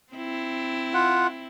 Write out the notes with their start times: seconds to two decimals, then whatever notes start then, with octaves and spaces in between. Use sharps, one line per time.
0.13 C4 E4
0.94 F4 F#5